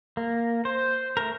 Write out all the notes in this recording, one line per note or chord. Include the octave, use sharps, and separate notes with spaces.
A#3
C5
A3 A#4